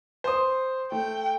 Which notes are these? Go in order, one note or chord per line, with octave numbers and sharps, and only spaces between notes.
C5 C6 D#6
A3 G5